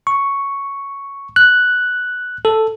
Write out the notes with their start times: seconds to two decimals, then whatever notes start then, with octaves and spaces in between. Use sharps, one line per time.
0.07 C#6
1.36 F#6
2.45 A4